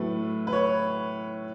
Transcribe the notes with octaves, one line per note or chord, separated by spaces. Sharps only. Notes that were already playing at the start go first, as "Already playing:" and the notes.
Already playing: A2 F#3 A3 B4
B4
C#5